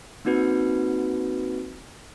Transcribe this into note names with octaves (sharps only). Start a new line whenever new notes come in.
A#3 C4 D#4 F#4 B4